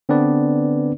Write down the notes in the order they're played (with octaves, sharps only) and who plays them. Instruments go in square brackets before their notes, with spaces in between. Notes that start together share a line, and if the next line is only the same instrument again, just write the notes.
[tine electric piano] D3 B3 C4 D4 B4 D5